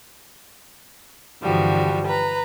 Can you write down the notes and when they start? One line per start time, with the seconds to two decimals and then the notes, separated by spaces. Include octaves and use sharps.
1.42 G2 D3 E3 F3 G3 F#4
2.06 B4 A#5